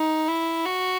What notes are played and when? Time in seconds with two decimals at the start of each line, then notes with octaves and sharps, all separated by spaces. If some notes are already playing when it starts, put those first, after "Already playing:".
Already playing: D#4
0.28 E4
0.65 F#4